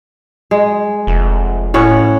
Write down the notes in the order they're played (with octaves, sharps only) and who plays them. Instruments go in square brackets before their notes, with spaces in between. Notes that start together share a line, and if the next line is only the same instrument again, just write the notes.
[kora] G#3
[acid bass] F1
[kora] A2 C#4 F#5